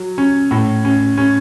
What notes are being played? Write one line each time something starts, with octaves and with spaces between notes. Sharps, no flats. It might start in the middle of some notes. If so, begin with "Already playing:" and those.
Already playing: F#3
C#4
A2
C#4
C#4